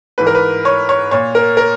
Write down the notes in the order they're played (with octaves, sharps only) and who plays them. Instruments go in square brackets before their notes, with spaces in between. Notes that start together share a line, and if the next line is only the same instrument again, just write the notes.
[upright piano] G#2 E3 B4
A#4
B4
C#5
C#5
A#2 C#5
A#4
A#4